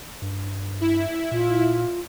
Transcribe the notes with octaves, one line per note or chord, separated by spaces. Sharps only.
G2
E4
A#2 F4